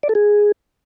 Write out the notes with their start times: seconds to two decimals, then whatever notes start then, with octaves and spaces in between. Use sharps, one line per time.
0.03 D5
0.09 A4
0.15 G#4